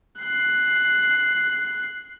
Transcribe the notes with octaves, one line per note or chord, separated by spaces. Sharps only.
F#6 C7